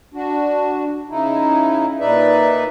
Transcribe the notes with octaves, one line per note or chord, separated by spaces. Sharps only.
D4 F#4
C#3 D#4 E4
A#2 D#4 B4 D5 E5